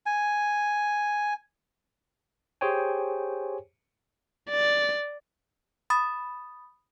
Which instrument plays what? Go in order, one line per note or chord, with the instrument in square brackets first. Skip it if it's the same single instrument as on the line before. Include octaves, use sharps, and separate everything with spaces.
[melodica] G#5
[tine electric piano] G4 G#4 C5 C#5 G5 G#5
[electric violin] D5
[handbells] B5 D#6 A6